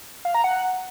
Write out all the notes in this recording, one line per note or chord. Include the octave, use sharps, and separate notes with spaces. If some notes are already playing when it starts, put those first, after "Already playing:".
F5
A#5
F#5